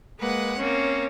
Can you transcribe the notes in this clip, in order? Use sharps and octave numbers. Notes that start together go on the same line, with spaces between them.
G#3 A#3 B4 F#5
A#3 C4 C#4